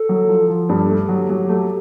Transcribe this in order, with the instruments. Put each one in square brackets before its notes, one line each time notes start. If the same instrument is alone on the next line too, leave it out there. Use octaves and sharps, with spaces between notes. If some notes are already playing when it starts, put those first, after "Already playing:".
Already playing: [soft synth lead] A4
[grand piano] F#3
F3
F3
[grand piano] G2 [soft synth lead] G4
[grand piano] A3
F#3
F#3
A3